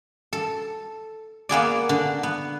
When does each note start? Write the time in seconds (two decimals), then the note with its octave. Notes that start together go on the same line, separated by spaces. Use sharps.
0.33 A4
1.49 A#3 B3 G#4 D5
1.89 D3
2.23 B3